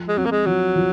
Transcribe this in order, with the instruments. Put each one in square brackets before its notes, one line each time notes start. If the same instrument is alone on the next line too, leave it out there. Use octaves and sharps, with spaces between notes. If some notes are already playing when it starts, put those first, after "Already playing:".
Already playing: [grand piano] F3
[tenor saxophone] G#3
[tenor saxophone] F#3 [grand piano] C4
[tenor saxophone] A#3
G#3
[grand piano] F3 [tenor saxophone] F#3
[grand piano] F3